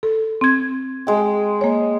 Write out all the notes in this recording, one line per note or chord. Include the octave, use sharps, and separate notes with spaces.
A4
C4 G#6
G#3 G5
A#3 C#5